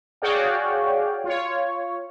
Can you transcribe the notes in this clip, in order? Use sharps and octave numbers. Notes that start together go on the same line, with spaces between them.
F#4 G#4 C#5 D5 F5 G5
F4 C#5